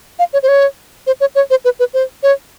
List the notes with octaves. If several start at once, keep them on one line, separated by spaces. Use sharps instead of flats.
F5
C#5
C5
C#5
C5
C#5
C#5
C5
B4
B4
C5
C#5